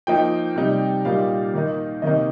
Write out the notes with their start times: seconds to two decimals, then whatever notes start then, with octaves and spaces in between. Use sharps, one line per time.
0.07 F3 A#3 D#4 G5
0.56 C3 G3 D#4
1.05 A#2 G3 A#3 D#4 F5
1.54 D#3 A#3 D#4
2.02 C3 D#3 A#3 D#4 D#5